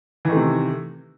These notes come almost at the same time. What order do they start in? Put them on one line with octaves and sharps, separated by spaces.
E3 D#3 A3 C3